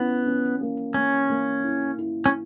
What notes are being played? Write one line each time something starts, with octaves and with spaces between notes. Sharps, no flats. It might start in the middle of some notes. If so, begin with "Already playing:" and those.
Already playing: B3 C#4 E4
C#4
A#3
A#3 C#4
A#3
E4
E4
C#4